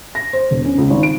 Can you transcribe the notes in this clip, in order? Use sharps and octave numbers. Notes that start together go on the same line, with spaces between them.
A#6
C5
E1
C#4
C#2
G#1
D7